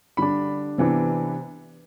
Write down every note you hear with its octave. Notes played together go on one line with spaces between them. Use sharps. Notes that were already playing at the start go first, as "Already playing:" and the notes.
D3 G3 D4 B5
C3 E3 B3 D4